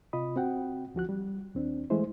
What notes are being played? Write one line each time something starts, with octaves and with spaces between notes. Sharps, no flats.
C3 F4 D#5 B5 D#6
C4 F#4 F#5 G5
D2 F3 F#4 F#6
G3
D#2 C4 D4
E3 G#3 A3 E4 C5